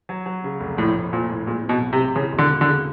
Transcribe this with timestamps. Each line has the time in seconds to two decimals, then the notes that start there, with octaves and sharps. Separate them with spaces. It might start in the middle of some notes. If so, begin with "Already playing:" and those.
0.09 F#3
0.26 F#3
0.44 C#3
0.60 F1
0.78 A#1 A2
0.95 A#1
1.12 A#2 F3
1.29 A2
1.47 A#2 G#3
1.63 C4
1.69 B2
1.81 B1
1.93 C3
1.98 C4
2.15 C#3 E3
2.32 E1
2.38 D3
2.50 C#3
2.61 D3
2.67 C#3